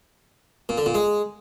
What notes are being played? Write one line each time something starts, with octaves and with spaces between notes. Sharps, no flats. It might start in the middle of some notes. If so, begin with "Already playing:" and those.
A#2
D3
A#2
G#3